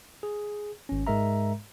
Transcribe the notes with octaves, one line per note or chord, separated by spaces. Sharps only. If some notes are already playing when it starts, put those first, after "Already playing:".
G#4
G#1 C#4
G#2 G#3 A#4 E5 A#5